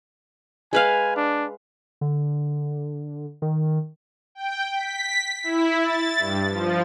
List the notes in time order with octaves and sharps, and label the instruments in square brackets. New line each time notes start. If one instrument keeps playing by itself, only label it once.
[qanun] G#3 B4 F5 [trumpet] G#5
[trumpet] D4
[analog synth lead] D3
D#3
[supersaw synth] G5
B6
E4
A6
G2
F3